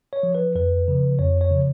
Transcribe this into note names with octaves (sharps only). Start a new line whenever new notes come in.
C#5
F3
B4
F2 B4
C#3 F3
F2 C#5
C#5
C#3 F3